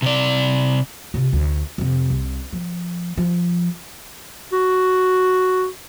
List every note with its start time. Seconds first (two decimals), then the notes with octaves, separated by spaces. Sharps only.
0.02 C3 D5
1.14 C3 F4
1.33 D2
1.78 F2 C3
2.10 C2
2.53 F3
3.17 F3
4.53 F#4